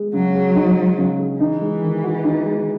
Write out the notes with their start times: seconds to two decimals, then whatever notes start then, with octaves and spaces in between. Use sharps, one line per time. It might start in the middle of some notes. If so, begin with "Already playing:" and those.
Already playing: G#3 G#4
0.13 C#3 F#3
0.35 G#4
0.55 D#4
0.76 G#3
0.98 C#3
1.19 G#4
1.39 E3 D#4
1.61 G#3
1.82 D#3
2.03 F#4
2.25 D#4
2.46 G#3